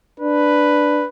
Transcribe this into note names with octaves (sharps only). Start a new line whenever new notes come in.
D4 B4